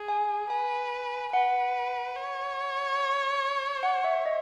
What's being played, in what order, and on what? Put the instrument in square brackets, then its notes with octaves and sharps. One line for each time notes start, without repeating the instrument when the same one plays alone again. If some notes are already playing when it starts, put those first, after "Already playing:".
Already playing: [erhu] G#4
[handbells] G#5
[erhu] B4 [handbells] G#5
[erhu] B4 [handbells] F#5
[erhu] C#5
[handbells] F#5
E5
D#5